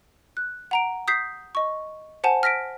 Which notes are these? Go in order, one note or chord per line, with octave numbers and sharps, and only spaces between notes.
F#6
F#5 A#5 D7
D#6 G6 B6 C7
D#5 C#6
C5 F#5 G#5 A5
F6 A#6 B6 D7